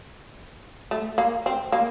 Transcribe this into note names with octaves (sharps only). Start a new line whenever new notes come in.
A3
A#3
C4
A#3